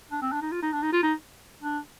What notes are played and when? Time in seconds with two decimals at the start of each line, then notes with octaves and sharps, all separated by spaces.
0.11 D4
0.22 C4
0.32 D4
0.42 D#4
0.52 F4
0.62 D#4
0.72 D4
0.82 D#4
0.92 F4
1.03 D#4
1.62 D4